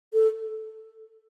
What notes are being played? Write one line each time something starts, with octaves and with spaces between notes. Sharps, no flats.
A4